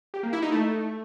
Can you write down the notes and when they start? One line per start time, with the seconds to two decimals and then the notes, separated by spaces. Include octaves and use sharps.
0.14 G4
0.23 A#3
0.33 E4
0.42 D#4
0.52 A3